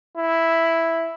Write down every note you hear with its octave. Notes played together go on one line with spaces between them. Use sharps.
E4